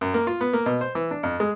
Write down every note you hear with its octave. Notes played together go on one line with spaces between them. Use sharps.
F#2
A#3
F4
B3
A#3
B2
C5
E3
D4
F2
G#3